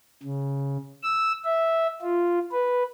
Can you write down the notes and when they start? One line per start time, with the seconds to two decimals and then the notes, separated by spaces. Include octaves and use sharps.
0.23 C#3
1.03 E6
1.44 E5
2.02 F4
2.52 B4